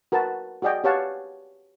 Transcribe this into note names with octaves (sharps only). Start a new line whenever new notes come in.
F#4 A#4 B4 A5
F#4 G#4 D5 D#5 G5
G4 B4 C#5 F5 F#5 A5